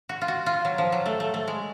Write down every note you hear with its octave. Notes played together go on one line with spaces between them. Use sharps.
F#4
F4
F#4
F4
F#3
F3
F#3
A3
A3
A3
G#3